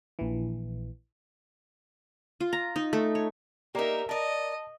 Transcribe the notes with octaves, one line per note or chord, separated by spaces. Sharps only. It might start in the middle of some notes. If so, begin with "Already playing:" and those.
A#1 E3
F4
A#5
D#4
A3
C#5
A#3 D#4 G4 A#4 D5 E5 A#5
A#4 D5 D#5 A5